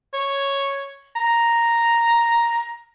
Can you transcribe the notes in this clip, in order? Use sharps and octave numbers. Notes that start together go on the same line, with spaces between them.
C#5
A#5